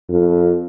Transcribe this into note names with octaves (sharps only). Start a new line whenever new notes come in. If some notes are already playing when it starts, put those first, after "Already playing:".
F2